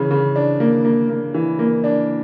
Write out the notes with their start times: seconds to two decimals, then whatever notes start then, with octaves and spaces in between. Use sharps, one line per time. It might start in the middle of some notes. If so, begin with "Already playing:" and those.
Already playing: C#3 E3
0.11 C#3
0.36 D4
0.60 A#3
0.85 A#3
1.09 A#3
1.34 E3
1.59 A#3
1.84 D4